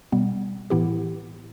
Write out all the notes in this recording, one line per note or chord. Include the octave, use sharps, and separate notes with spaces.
B2 G3 B3
A2 E3 B3 E4 G4